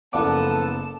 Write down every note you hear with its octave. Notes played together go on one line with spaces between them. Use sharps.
F#1 F3 B3 A4 F5 A5 D6